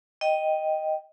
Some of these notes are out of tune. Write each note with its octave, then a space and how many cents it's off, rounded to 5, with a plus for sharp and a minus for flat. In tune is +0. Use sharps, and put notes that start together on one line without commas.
D#5 +0 G5 +0